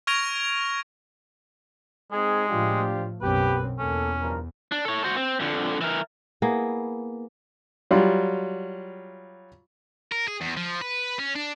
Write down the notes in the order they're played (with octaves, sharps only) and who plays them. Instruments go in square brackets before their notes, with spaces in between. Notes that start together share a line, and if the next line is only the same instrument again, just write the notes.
[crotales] C#6 F6 G#6 A#6 D7 F7
[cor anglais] G#3 [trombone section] C4 D#4 G#4
[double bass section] A2 F3 A3 [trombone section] D4 F4 G4
[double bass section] B1 F#2 C4 [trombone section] B3 G4 [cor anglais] B4
[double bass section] E2 [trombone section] A#3 A4 [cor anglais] C#4
[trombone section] G2 F3 A#4
[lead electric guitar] D4
A4 C#5
F#4 C5
C4
F2 D3
E3 A#4
[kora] A#3 B3 E4 G#4
[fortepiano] F#3 G3 F4
[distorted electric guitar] A#4
G#4
E2
F3
B4
C#4
D4